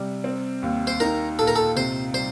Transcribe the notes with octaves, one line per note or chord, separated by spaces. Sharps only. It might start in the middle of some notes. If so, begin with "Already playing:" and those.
Already playing: C3 G3
C4
D#2
C5
D#4 A#4
A#2 A4
A#4
A4
C3 C5
G3 C5